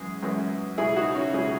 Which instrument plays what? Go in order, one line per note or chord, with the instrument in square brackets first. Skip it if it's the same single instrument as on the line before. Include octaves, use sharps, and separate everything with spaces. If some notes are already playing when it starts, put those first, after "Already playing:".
Already playing: [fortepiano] F#2 E3 G#3 G#4
F#2 E3 G#3
C#2 B2 F#3 E4 G#4
D#4 F#4
C#4 E4
C#2 B2 F#3 E4 G#4